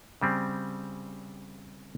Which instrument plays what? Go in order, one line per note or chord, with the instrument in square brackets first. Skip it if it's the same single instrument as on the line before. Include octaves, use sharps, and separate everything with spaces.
[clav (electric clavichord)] C#3 G3 C4